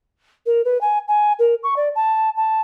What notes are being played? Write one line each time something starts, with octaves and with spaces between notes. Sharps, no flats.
A#4
B4
G#5
G#5
A#4
C#6
D5
A5
A5